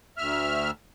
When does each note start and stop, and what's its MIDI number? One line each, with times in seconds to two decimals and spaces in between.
0.18 0.71 38
0.18 0.71 76
0.18 0.71 89